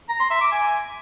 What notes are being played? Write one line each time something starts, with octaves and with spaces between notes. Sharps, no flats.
A#5
C6
E5
D6
G#5